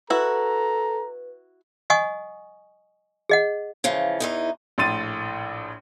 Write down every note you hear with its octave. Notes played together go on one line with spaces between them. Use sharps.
E4 F#4 A4 B4 A#5
D#5 F#5 G#5 C#6 D#6
G#4 D#5 F#5
C#3 E3 F3
E2 E3 D#4
A#1 A2 C6 A6 D#7